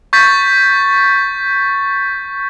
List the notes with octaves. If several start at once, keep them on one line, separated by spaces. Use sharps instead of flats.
C#6 G6 A6 B6